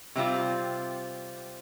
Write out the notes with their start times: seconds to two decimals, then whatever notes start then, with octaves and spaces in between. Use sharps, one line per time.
0.16 C3 G3 C4 F4